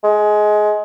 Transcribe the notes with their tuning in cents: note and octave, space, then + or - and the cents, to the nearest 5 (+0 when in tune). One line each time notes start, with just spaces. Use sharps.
G#3 +20